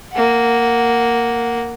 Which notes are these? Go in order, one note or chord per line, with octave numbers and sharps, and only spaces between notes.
A#3 F#5